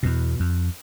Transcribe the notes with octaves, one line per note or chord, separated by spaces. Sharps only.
E2 B2
F2